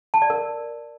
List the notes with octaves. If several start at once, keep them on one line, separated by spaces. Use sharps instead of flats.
A5
D5
A#4